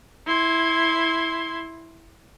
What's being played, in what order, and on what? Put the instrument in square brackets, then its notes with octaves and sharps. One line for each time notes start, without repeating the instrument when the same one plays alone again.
[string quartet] E4 C6 G#6